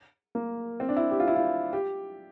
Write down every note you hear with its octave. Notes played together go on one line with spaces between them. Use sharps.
A#3
C4
D4
E4
G4
F4
E4
F4
G4